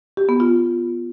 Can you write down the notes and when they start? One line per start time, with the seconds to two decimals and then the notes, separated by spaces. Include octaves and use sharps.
0.17 G4
0.29 B3
0.40 F4